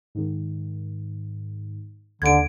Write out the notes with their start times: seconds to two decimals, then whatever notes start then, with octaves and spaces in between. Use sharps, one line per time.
0.15 G#2 D#3
2.22 D#2 D3 G#6 D7